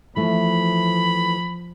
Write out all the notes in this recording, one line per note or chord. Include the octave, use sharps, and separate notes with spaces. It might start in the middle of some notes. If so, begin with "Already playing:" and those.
E3 F3 A3 B5